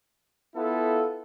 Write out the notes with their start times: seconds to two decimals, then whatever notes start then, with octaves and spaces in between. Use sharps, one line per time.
0.56 B3 E4 F4 A4